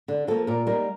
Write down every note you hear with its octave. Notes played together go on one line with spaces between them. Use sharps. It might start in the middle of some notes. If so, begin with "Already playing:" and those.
D3
F3 A#3 A4
A#2 A#4
G3 A#3 D#4 A#4